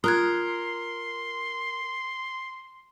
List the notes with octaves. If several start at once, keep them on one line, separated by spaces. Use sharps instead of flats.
F4 A#4 C6 D#6 F#6 G#6